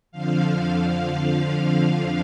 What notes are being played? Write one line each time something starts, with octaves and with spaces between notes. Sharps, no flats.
F2 D3 F3 F5